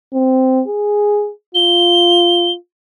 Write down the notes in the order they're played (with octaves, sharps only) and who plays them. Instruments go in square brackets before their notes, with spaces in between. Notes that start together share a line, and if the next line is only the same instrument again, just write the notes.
[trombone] C4
G#4
[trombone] F4 [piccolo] G7